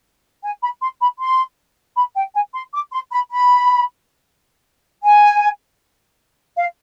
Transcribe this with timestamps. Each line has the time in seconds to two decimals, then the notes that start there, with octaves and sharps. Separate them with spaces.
0.43 G#5
0.62 B5
0.82 C6
1.01 B5
1.19 C6
1.96 B5
2.16 G5
2.34 G#5
2.54 C6
2.74 D6
2.92 C6
3.12 B5
3.31 B5
5.03 G#5
6.57 F5